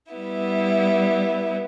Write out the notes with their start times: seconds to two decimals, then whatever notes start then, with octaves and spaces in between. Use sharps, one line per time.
0.12 G3 B3 E4